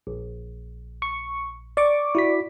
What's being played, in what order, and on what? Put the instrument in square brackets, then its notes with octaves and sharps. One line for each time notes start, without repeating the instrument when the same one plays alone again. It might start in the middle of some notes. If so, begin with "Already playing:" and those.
[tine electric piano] A#1
[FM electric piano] C#6
D5 C#6 D6
[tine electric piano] E4 F#4 B6